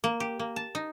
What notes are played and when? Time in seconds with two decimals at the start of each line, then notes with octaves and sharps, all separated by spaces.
0.04 A#3
0.20 G4
0.39 A#3
0.56 A5
0.75 D#4